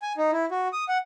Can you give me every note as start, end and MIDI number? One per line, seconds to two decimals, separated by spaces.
0.02 0.13 80
0.17 0.31 63
0.32 0.46 64
0.51 0.68 66
0.73 0.84 87
0.88 0.98 78